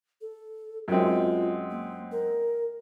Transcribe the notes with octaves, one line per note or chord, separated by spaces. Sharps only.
A4
F#2 G#3 C4 F4
A#3
A#4